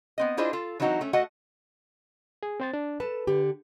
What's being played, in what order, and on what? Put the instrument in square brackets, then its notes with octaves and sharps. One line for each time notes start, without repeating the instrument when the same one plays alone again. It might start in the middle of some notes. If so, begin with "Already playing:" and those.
[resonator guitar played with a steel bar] B3 C4 D#5
D4 E4 F4 G#4 C5 D#5
F4 A4
E3 F#3 C4 D#4 F#4
A3 C#4
A3 F#4 D#5 F#5
[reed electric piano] G#4
C4 C5 A6
D4
[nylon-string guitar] A4 A5 [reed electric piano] B4
[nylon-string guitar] D3 G4